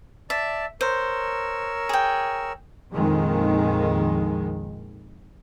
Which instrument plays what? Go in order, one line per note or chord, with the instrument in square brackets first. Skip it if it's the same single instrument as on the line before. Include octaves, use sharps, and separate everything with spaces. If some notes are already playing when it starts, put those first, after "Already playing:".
[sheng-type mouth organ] D5 A5 [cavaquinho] E5
[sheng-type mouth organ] A#4 C#5 E6 [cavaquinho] C5
[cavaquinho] G#4 G5
[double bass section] A#1 F2 D#3 G#3